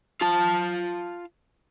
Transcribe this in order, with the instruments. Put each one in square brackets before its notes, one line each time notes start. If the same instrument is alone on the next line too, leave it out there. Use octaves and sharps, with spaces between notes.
[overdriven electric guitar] F4 A5